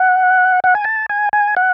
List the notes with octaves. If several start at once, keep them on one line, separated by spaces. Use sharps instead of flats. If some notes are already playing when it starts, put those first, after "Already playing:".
Already playing: F#5
F#5
G#5
A5
G#5
G#5
F#5